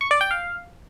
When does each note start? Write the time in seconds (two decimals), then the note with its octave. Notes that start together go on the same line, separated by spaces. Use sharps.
0.01 C#6
0.11 D5
0.21 G5
0.31 F5